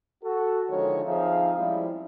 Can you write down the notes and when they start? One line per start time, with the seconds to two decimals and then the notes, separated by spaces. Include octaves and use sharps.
0.23 F#4 A4
0.70 D3 D#3 F3 G#3 C#5
1.05 F3 C4 D#4 G#4 E5 F5
1.57 F3 G3 G#3 C4 C#4 E4